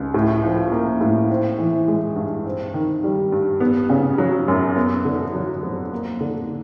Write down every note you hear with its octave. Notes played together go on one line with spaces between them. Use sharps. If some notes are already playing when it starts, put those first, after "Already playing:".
Already playing: C#2
A2
F3
A#3
A2
C4
E3
G#3
G2
C4
D#3
G3
G2
B3
C#3
F#3
F#2
B3
D3
F#3
F2
A#3
D3